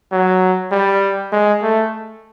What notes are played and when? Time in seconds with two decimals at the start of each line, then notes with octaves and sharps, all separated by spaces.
0.12 F#3
0.72 G3
1.32 G#3
1.63 A3